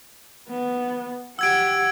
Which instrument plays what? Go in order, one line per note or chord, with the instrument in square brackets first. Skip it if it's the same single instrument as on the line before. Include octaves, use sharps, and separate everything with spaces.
[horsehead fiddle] B3
[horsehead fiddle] G4 F#5 [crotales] E6 G#6 D7